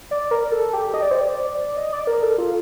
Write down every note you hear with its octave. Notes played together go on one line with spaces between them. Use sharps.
D5
A#4
A4
G4
D#5
D5
C5
D5
D#5
D5
A#4
A4
F4